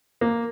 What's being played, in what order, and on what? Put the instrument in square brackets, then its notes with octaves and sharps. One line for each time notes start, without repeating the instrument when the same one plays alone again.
[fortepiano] A#3